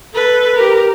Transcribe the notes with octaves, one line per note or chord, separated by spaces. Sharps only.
A4 B4
G4 A#4